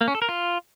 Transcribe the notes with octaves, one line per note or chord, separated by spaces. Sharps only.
A#3
C#4
A4
A#4
F4